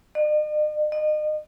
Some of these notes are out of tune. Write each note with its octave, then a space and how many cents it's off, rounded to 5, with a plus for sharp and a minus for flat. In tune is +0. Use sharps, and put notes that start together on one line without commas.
D#5 -45
D#5 -35